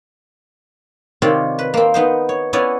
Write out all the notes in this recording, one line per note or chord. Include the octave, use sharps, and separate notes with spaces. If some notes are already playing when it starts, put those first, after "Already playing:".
C3 D#3 C4 F4 C#5 D5
B4
A#3 C4
B3 D#4 C5
C#5
B3 C#4 E4 C#5 D5 G#5